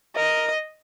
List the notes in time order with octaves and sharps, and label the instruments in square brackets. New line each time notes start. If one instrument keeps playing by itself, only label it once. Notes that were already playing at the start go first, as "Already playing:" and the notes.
[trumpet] A#4 [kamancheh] D#5